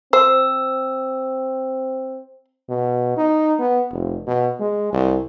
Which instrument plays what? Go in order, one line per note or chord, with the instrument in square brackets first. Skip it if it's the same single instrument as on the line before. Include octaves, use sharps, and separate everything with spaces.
[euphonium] C4 [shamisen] C5 [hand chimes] E6
[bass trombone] B2
D#4
B3
F1
B2
G#3
C2